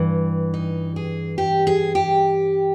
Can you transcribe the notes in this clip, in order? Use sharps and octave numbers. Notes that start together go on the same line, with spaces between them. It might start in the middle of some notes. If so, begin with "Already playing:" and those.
Already playing: G2 E3
D#4
G#4
G4
G#4
G4